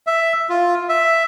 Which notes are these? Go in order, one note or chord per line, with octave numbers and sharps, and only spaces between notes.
E5
F4
E5